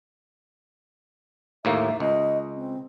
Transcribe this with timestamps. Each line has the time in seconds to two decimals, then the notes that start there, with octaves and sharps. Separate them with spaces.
1.65 D#2 A2 A#3 E5
2.00 C#2 D#5
2.56 C4